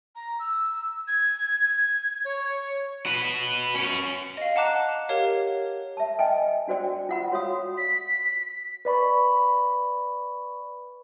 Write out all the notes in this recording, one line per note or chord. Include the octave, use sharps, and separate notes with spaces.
A#5
E6
G#6
G#6
C#5
F#4 B4
C#4 F#4
D#5 F5
F#5 A5 A#5 D6 F#6 E7
G4 A#4 C#5 F5
E5 A5
D#5 G5 G#5
D4 F#4 C5 D5 G5
F4 F#5 B5
F#4 C#5 F5 D#6
B6
B4 D5 B5 C#6